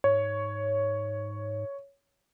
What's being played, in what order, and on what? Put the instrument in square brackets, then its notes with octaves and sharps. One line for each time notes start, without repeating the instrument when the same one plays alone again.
[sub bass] G#2 [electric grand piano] C#5